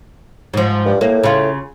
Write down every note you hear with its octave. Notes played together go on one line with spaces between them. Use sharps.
G#2 F3
G2
A2 A#3
C#3 F4